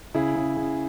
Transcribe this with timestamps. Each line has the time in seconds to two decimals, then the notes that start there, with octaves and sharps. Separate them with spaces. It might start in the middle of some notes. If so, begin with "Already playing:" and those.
0.14 C#3 E4 G#4
0.36 C#3
0.57 C#3